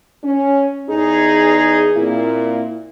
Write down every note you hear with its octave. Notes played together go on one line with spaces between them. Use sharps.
C#4
E2 D#4 G#4
A#2 A#3 C4 E4